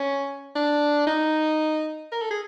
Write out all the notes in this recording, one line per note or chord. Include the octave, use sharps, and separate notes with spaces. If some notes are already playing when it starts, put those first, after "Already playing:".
Already playing: C#4
D4
D#4
A#4
A4
G#4